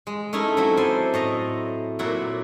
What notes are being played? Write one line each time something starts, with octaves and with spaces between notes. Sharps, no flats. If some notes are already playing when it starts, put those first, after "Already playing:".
G#3
A3 C#4 D#4 E4
F#3 C4 E4
A4 C5 D5 G#5 A5
A2 D#5 A#5
A#2 F#3 E4 D5 F#5